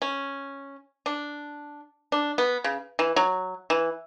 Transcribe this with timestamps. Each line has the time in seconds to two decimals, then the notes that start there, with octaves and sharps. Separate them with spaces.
0.02 C#4
1.06 D4
2.12 D4
2.38 B3
2.64 C#3
2.99 E3
3.16 F#3
3.70 E3